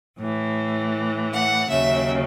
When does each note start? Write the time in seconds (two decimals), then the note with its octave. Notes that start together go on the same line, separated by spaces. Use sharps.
0.18 A2 E3
1.32 F#5
1.69 D#2 C#3 F#3 E5